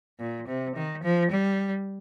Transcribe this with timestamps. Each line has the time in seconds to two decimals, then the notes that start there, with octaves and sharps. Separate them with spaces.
0.20 A#2
0.48 C3
0.76 D#3
1.03 F3
1.31 G3